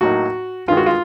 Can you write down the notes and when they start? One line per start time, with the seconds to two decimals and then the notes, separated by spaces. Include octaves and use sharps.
0.01 A2 F#3 A#3 D#4 F#4
0.68 G2 D#3 G#3 F4
0.77 F#4
0.86 F4